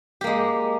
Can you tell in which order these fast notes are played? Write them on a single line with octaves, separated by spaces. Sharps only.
G4 A#3 G#3